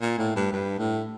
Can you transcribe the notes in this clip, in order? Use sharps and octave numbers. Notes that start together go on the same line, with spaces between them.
A#2
A2
G2
G2
A2